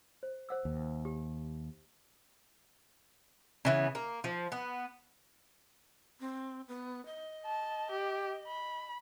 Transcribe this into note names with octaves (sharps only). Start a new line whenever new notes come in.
C5
C5 F#5 E6
D#2
G4
C#3 E3 B3
A#3
F3
B3
C4
B3
D#5
A5
G4
B5